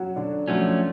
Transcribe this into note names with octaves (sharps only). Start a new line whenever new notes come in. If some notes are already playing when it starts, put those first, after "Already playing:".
Already playing: F#3 C#4 F#4
D3 D4
F3 F#3 A3 C#4 F#4